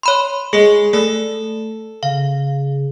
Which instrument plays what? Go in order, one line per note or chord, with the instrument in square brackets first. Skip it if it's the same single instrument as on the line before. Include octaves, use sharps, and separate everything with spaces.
[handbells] C#5 B5 C6
[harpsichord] G#3 [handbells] G#4
[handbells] A3 [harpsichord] A4
[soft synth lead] C#3 [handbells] F5